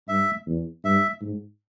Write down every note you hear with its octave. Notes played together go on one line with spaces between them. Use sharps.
G2 E5
E2
G2 E5
G#2